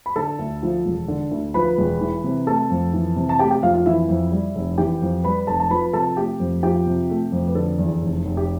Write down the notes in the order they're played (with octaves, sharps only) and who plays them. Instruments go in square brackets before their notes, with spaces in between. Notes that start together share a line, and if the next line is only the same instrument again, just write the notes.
[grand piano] B5
D3 A4 A5
D2
F3
E1
D3
D2
F3 B4 B5
E1
E3
C3
A3 A4 A5
F2
E3
C3
A5
A3 G4 G5
G4 G5
F2 F4 F5
F4 F5
E3 E4 E5
F2
G3
F1
E3 G4 G5
F2
G3 B4 B5
F1 A4 A5
A5
F3 B4 B5
C3 A4 A5
A3 G4 G5
F2
F3 G4 G5
C3
A3
F2
B4
D3 A4
E2
F1
F1
G4